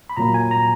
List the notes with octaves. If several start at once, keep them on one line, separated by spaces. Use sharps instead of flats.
B5
A#2 F#3 A#3 A#5
G#5
A#5